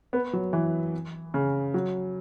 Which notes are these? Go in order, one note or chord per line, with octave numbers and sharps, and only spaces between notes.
B3
F#3
E3
C#3
F#3